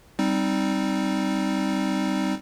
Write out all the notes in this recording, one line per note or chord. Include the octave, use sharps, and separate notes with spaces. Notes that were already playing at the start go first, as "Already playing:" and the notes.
G3 C4 D#4